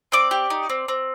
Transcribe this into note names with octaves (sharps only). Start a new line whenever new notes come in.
C4 D5 D6
G4
D#4
C4
C4